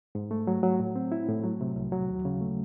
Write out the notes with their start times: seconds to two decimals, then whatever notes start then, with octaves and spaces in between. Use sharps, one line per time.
0.15 G#2
0.31 A3
0.47 F#3
0.63 F#3
0.80 A2
0.96 C4
1.12 E4
1.28 A2
1.43 F#3
1.61 C3
1.76 C2
1.92 F#3
2.09 D#2
2.25 C#3
2.41 A3